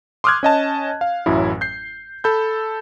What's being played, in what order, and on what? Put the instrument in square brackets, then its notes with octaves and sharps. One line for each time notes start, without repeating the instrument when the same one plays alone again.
[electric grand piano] C6 D6 D#6 F6 F#6 G#6
C#4 D#5 A5
F5
A1 F#2 F#3 E4
G6 C7
A4 B5 G6